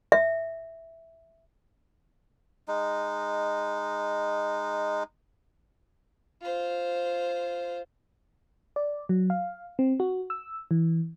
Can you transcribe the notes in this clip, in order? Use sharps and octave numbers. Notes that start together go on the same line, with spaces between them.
E5
G#3 D#4
F4 C5
D5
F#3
F5
C4
F#4
E6
E3